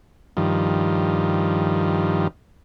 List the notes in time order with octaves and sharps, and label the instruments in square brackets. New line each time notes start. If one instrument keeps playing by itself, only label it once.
[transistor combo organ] G2 D#3 F3